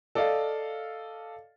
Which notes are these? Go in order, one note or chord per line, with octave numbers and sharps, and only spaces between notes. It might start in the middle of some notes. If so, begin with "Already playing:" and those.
A4 D5 D#5 F5